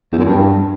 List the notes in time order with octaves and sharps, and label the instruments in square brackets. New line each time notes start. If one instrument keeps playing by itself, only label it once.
[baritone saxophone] E2
F#2
G2